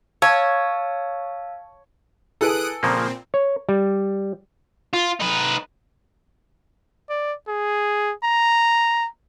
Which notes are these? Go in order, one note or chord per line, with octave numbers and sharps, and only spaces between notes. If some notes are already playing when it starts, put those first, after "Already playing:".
C#5 F5 A5 E6
E4 G#4 A4 B4 G#5 D#6 F#6 D7
A#2 C#3 F3 A#3 C4 A#5
C#5
G3
F4
D#4 B4
D5
G#4
A#5